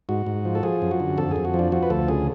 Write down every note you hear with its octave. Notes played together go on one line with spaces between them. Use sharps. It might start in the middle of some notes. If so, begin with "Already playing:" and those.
G#2 F#4
G#2
F3
A4
F3 G#4
F#2
F#4
D3
F2 A4
F2 G#4
F#4
F3
D4
F3 F#4
B4
D2 A4
C#3 G#4